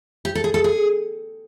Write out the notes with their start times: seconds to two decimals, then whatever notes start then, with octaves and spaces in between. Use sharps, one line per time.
0.25 G4
0.35 A4
0.44 G#4
0.54 A4
0.64 G#4